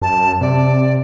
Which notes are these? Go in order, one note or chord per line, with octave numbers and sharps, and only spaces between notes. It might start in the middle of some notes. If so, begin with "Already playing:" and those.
F#2 A5
C3 D5